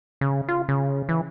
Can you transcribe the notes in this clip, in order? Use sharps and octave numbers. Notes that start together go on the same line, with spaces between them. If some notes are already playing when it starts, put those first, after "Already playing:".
C#3
F4
C#3
E3